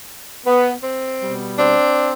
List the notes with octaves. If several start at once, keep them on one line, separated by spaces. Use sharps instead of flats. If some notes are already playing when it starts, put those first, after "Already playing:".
B3
C4
B2 G3 B3
C4 D4